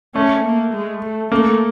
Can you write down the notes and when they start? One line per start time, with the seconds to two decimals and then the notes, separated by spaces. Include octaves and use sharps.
0.15 A3 C#4
0.44 A#3
0.74 G#3
1.02 A3
1.31 A3 A#3